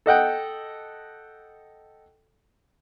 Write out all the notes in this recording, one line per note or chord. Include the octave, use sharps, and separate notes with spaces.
A4 D#5 F#5 G5